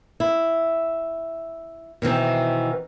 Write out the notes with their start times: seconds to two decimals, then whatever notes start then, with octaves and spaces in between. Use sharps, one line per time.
0.20 E4
2.02 B2 D#3 E3 C4